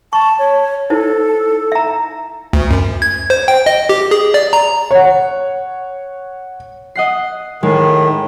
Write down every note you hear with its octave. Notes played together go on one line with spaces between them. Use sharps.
A5 C#6
C#5
D#4 E4 A4 C5
E5 A#5
D2
F#2
G#6
C5
G5
D#5
G4
G#4
D5
A#5
C#5 F#5
D#5 F#5 C7
A2 D#3 G#3